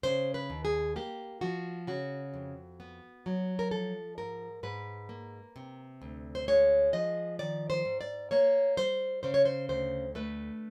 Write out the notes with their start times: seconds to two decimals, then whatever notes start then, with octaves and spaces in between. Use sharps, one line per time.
0.03 C#3 C5
0.34 B4
0.50 D#2
0.65 G#4
0.96 A#3 G4
1.41 F3 F#4
1.87 C#3 F#4
2.34 F2
2.80 B3
3.26 F#3
3.59 A#4
3.71 F3 A4
4.18 G#2 A#4
4.63 G#2 B4
5.09 A#3
5.56 C3
6.02 D2
6.35 C5
6.48 G#3 C#5
6.93 F3 D#5
7.39 D#3 D5
7.70 C5
7.85 G#2
8.01 D5
8.31 A#3 C#5
8.77 G3 C5
9.23 C#3 C5
9.34 C#5
9.45 C5
9.69 D2 C5
10.15 A3 B4